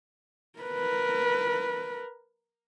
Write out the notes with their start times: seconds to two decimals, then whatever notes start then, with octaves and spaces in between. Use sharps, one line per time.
0.59 A#4 B4